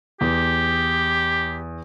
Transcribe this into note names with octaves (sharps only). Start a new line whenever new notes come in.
E2 G4